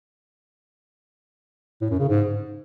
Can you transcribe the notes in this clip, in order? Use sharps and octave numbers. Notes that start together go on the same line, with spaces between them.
A2
F#2
C#3
G#2